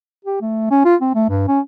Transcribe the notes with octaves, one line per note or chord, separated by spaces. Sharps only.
G4
A3
C#4
F4
C4
A3
G2
C#4